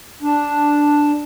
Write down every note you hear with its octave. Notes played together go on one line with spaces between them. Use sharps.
D4